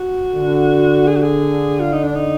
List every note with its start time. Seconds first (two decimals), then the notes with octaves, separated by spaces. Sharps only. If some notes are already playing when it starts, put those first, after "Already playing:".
Already playing: F#4
0.34 D3
1.07 G#4
1.16 F#4
1.22 G#4
1.80 F4
1.93 D#4
2.03 D4
2.15 D#4